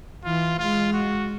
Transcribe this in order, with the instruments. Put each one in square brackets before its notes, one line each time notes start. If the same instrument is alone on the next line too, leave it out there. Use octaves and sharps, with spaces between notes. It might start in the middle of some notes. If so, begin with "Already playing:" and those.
[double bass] E3 [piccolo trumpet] F4
[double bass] G#3 [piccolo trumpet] F4
[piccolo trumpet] F#4